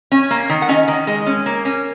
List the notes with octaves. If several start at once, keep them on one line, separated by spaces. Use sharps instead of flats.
C#4
A#3
D#3
F#5
C#4 D#5
D#3
G#3
C#4
A#3
C#4